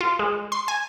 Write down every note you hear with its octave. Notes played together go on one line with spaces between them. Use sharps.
F4
G#3
C6
G#5